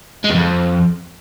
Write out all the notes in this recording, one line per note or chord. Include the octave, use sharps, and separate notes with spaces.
G#3
E2
F2